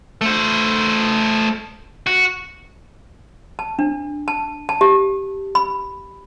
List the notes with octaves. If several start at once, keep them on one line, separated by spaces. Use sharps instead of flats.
A3 C5
F#4
A5
D4
A5
A5
G4
B5